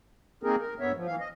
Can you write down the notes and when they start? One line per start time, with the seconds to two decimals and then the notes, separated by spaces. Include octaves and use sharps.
0.43 A#3 C4 D#4 G#4 A#4
0.59 A#4
0.80 G2 B3 C#5 E5
0.95 F3
1.07 E3 F5
1.20 D#5